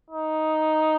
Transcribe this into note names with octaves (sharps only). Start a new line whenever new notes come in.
D#4